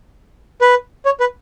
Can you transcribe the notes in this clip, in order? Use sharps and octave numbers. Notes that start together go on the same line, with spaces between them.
B4
C#5
B4